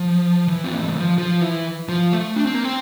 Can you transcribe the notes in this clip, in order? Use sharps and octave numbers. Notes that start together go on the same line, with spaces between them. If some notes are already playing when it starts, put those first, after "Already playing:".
Already playing: F3
E3
C4
A#3
A3
G3
F3
F3
E3
F3
A3
D4
C4
A#3
C4